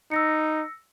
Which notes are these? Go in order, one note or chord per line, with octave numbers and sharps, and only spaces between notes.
D#4 E6 A#6 C#7